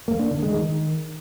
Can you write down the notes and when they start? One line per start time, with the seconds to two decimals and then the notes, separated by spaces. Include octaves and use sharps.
0.08 A#3
0.19 D4
0.31 D3
0.42 G#3
0.54 D#3